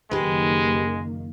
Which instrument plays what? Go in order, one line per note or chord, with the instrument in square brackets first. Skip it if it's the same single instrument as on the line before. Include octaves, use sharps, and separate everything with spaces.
[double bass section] F#1 D#3 A#3 [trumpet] G#3 [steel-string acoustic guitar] G4 B4